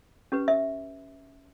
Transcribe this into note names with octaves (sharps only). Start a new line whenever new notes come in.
C#4 G4 B4
E5